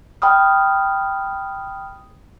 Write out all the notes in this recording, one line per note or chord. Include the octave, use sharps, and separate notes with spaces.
G5 B5 D#6 F6